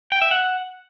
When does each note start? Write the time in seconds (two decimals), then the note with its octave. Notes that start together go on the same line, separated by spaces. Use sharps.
0.12 G5
0.22 E5
0.31 F#5